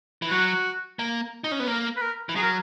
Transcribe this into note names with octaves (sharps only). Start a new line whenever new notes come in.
E3
F#3 F#4
A#3
D#4
C#4
B3
A#3 A#4
B4
A#4
E3
F#3 G#4
A#4